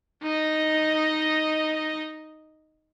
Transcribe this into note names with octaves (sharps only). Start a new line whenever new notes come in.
D#4 D#5